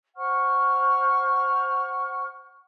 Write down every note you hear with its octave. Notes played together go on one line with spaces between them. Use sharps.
C5 F#5 C#6 F6